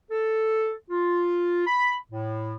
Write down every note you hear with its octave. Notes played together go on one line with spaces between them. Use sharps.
A4
F4
B5
A2